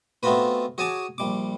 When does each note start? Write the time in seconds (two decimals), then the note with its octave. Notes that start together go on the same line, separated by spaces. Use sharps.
0.23 A3 B3 C4 F4 F#4 B4
0.78 F#4 G#4 C#5 G#5 A5 D6
1.18 A#1 G3 D6